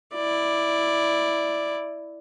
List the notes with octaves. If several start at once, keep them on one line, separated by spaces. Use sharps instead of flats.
E4 D5